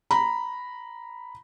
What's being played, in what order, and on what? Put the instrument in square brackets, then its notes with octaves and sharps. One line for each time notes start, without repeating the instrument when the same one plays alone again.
[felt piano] A#5 B5